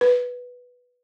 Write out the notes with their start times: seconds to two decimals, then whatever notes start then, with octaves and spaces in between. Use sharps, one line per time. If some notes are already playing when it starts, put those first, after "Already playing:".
0.01 B4